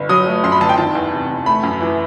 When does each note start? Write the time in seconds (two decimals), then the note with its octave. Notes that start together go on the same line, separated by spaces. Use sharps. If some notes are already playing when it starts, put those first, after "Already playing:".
Already playing: G1
0.09 F#3 D#6
0.27 A3
0.44 F#2 C6
0.52 B5
0.61 G1 A5
0.69 G5
0.78 D#3 A5
0.95 E2
1.12 C3
1.29 E2
1.46 A3 B5
1.63 F#2
1.81 E3